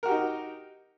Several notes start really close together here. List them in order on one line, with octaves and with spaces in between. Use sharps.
A#4 F#4 G4 D#4